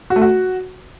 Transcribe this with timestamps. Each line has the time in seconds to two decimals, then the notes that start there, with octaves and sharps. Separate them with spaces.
0.10 F#4
0.16 A3
0.22 F#4